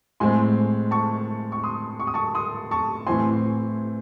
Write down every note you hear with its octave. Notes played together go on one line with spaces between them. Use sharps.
A2 G#3 C4 G#5 C6
A5 C#6
C#6
C6 D#6
C#6
D#6
A5 C#6
C6 D#6
A5 C#6
A2 E3 C4 G#5 C6